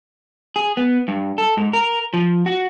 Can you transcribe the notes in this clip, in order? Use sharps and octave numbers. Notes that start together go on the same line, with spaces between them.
G#4
B3
G2
A4
G#2
A#4
F3
F#4